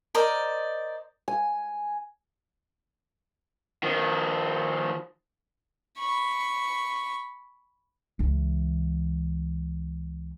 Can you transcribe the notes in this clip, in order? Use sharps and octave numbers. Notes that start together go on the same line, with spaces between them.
A#4 C5 D5 D#5
G#5
D#3 F3
B5 C#6
C#2 E3